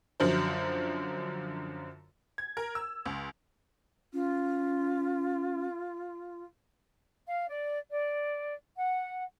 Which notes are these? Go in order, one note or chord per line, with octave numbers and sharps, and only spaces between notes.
F#2 D3 F3 F#3 C5
G#6
A#4
E6
C#2
C#4 F4
F5
D5
D5
F#5